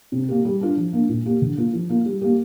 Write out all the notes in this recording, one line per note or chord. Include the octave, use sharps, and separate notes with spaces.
C3
A#3 G4
G3
D4 F4
F3
A#3 D4
A#2
A#3 G4
D3
A#3 F4
F3
A#3 F4
G3
A#3 G4